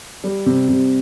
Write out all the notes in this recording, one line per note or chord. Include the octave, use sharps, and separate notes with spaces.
G3
C3
C3